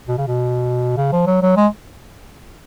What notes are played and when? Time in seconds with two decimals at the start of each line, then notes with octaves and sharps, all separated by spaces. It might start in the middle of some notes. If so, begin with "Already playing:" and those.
0.08 B2
0.18 C#3
0.27 B2
0.97 C#3
1.12 F3
1.26 F#3
1.42 F#3
1.56 G#3